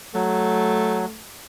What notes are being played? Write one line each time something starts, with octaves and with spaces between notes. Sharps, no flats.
F#3 A3